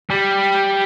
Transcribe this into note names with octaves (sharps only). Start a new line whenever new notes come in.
G3